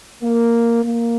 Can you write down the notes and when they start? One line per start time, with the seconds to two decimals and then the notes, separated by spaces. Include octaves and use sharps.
0.22 A#3
0.83 A#3